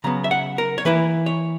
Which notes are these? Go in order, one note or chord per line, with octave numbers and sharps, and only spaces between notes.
C#3 F#3 B3 A#5
E5
F#5
A#4
C#5
E3 A#3 E4 B4
C#5